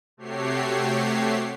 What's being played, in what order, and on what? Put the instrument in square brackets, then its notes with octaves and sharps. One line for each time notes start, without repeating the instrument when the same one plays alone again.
[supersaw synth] C3 A3 F#4 G4 C#5 C7